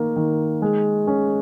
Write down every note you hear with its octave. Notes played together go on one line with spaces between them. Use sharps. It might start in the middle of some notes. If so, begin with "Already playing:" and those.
Already playing: D#3 A#3
D#3
G#3
C#4